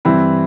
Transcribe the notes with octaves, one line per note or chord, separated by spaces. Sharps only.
G2 E3 C4 E4